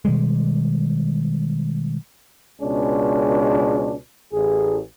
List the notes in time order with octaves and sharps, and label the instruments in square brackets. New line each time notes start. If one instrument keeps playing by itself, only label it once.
[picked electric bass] B2 D#3 G3 G#3
[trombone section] C#2 B2 G#3 C#4 D4
A1 G#4